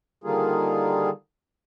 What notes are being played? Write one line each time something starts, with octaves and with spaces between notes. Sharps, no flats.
D3 D#3 G3 A#3 F4 G#4